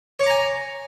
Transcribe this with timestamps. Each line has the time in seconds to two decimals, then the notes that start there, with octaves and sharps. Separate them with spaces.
0.20 C#5
0.23 D6
0.26 A#5
0.30 G#5